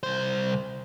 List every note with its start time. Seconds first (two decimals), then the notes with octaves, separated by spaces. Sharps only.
0.03 C2 C5